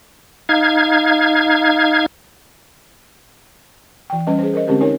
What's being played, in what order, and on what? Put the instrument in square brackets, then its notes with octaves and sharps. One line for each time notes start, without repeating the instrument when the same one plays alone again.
[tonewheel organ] D#4 F5 G#6
[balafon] E3 G5
G3 C#4 B4 D#5
G#4 B4 C5
A#4 C5 D#5
D3 G#3 C4 C#4 G4 A#4
D#4 A#4 C#5 G#5